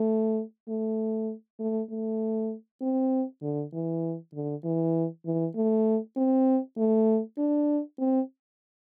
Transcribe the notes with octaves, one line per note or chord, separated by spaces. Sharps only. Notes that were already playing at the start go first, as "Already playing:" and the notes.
Already playing: A3
A3
A3
A3
C4
D3
E3
D3
E3
E3
A3
C4
A3
D4
C4